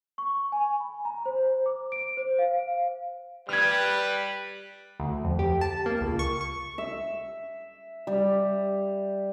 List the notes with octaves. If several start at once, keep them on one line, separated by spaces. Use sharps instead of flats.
C#6
G#5
B5
A#5
C5
D6
D7
C5
F5
G3 B4 F6 G#6
D2
F2
G4
A5
A#3
C#2
C#6
C#6
E5
G3